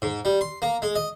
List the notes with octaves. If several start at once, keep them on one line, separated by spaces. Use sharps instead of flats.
G#2
G3
C6
A#3
G#3
D#5